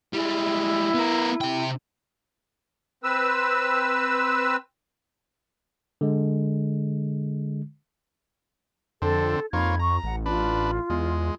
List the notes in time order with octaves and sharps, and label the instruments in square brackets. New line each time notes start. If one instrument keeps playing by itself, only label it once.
[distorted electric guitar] G3 G#3 [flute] E4
[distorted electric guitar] B3 A#4
C3 G5
[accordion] C4 B4 E6
[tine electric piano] D3 G#3
[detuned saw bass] F2 [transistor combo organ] D3 C4 [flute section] A4
[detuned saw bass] F2 [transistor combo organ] A#3 F4 C#5 [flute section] D#4 B5 G#6
[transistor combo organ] A#5 [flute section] C#6
[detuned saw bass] A1 [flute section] F#5
[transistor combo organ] D4 B4 [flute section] F4
[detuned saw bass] E2 [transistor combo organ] G#3